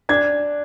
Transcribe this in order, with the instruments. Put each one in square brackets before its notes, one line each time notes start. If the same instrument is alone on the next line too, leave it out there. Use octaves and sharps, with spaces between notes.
[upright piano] D4 G#6